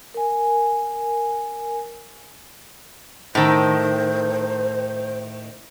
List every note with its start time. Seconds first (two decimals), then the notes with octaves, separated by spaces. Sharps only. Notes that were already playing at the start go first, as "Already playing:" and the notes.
0.14 A#4 G#5
3.35 A2 D#3 C5